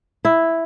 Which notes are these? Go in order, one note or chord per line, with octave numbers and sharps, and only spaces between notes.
E4